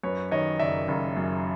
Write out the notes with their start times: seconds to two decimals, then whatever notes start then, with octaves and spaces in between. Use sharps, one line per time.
0.03 F#2 B4 C#5
0.31 D#3 C#5 D#5
0.59 F#1 D5 E5
0.88 F#1
1.17 F#2